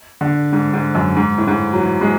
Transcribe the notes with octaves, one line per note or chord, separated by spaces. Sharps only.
D3
G#2
G#2
F#2
G#2
A2
G#2
F#3
E3
G#3